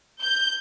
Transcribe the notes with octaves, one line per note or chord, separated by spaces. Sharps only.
G6